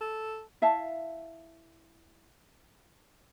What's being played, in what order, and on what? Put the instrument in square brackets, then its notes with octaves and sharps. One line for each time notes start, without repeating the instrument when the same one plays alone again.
[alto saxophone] A4
[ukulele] E4 E5 F5 A5